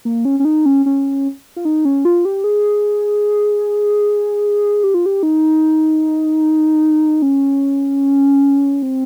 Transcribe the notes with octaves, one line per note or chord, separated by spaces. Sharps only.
A#3
C#4
C#4
D#4
C#4
C#4
F4
D#4
C#4
F4
G4
G#4
G4
F4
G4
D#4
C#4
C4